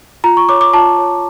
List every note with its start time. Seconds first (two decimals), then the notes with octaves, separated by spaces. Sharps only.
0.24 F4 A#5
0.37 C#6
0.49 C#5 D6
0.61 D6
0.73 F4 A5
0.99 C#5